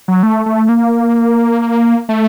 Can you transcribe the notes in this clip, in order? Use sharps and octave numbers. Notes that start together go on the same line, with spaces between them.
F#3
A3
A3
A#3
A3